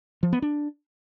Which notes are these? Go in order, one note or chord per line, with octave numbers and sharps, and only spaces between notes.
F3
B3
D4